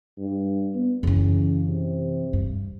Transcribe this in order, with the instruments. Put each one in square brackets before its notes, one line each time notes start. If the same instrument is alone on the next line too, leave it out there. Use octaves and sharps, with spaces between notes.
[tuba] G2
B3
[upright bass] F#2 E3 [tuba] C#3
[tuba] C3
[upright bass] G2